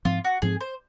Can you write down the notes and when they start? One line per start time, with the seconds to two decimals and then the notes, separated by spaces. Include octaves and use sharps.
0.05 G#2 F3 C4 F4
0.24 F#4
0.42 G#2 F3 C4 G#4
0.60 C5